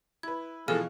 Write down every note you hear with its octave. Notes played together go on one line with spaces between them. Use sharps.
E4 B4 G#6
B2 E3 F3 G#3 G#4 A4 F5 F6